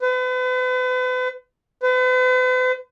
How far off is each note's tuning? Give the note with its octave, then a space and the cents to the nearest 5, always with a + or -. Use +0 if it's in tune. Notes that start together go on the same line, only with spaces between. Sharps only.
B4 +40
B4 +45